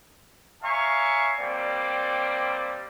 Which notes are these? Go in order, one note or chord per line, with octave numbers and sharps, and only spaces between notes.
C#5 E5 F5 G#5 A#5 C#6
G3 A#3 C4 D5